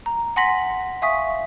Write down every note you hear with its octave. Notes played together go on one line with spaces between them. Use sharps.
A#5
F#5 G#5 C6 A#6 B6 F#7
E5 F5 G#5 C#6 D#6 B6